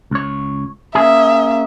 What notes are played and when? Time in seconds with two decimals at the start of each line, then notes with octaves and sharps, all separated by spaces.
0.11 C#2 C#5
0.95 A#3 C#4 G#4 E5